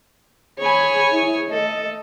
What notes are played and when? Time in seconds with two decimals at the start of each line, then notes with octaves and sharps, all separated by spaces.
0.59 G#4 C#5 G#5 B5
1.12 E4 G#4
1.50 A3 A4 D#5